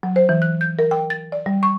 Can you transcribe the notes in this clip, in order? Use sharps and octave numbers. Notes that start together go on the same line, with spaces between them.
F#3
C5
E3
F#6
G6
A#4
G5
A6
D5
G3
C#6